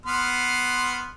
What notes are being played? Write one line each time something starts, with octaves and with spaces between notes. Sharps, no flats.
B3 C6 F6